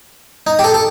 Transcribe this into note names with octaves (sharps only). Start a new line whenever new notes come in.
D#4
G4
A4
A4